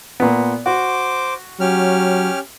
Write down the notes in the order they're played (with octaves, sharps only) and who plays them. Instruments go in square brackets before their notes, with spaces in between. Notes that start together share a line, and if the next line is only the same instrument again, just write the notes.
[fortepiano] A#2 B3
[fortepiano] F#4 [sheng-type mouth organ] C5 D6
[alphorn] F#3 [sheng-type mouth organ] C#4 G4 F6